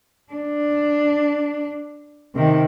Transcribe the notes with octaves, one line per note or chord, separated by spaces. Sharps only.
D4
C3 D#3